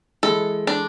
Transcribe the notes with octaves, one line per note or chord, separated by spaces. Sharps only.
E3 G#3 A4
D4